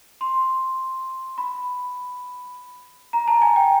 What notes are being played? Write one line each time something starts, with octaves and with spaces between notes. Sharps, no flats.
C6
B5
A#5
A5
G#5
G5